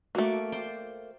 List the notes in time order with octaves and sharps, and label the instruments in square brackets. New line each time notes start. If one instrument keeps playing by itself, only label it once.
[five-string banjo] A3 A#3 [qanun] F#4 D6
[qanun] C5 D5 G5